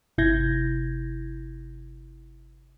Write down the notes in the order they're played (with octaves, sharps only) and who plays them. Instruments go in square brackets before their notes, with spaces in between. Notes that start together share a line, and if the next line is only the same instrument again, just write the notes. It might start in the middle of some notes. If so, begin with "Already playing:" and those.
[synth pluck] G1 C3 E4 G6 G#6 A#6